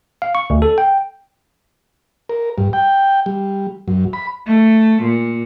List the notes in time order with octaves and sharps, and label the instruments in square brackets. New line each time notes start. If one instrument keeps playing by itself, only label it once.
[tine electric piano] F5
C#6
D2
A4
G5
[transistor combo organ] A#4
G2
G5
G3
F#2
B5
[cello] A3
A#2